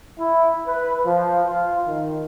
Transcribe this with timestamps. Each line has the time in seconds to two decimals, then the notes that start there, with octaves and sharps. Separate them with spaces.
0.19 E4
0.67 B4
1.06 F3
1.46 F4
1.88 D#3